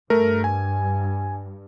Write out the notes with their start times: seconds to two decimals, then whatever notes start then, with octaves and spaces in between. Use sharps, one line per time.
0.10 G2 A3 A#4
0.44 G#5